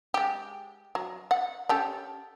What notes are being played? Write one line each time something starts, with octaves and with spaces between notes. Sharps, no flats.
G#3 G4
F#3
F#5
C#4 G4 A4